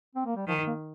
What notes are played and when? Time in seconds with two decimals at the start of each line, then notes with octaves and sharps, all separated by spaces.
0.15 C4
0.26 A#3
0.36 G3
0.47 D#3 F3
0.67 A#3